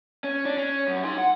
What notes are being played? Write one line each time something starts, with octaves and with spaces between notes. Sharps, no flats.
C#4
D4
C#4
F#2
D#4 C6
F#5